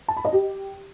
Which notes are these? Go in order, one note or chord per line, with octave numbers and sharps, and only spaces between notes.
A5
B5
D#5
G4